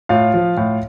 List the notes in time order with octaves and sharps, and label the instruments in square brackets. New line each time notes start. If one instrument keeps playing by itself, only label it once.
[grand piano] A2 F4 F5
F3
A2